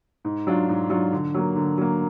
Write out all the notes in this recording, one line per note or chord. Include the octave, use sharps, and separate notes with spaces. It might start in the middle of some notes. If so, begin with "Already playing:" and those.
G#2
F#3 D4 F4
G#2
F#3 D4 F4
D3
F#3 A#3
D3
F#3 A#3